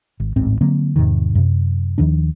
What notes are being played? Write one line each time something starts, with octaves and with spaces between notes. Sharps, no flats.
G#1
D1 A1 G#2 C4
D3 F#3 A#3 C4
E2 G#2 C3 D#3
F#2 C3
D#2 D#3 F3 D4